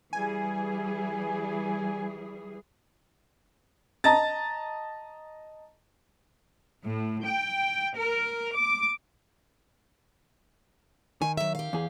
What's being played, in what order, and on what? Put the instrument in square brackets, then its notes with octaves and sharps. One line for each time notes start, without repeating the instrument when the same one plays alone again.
[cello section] E3 G3 G#4 [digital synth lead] G#5
[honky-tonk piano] D#5 A5 A#5 A6
[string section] A2
G5
A#4
D6
[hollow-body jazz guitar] D#3 [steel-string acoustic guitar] G#5
[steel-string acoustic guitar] F#3 E5
G4 F5
[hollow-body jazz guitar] E2 G#4